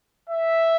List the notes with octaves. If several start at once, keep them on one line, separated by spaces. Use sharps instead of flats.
E5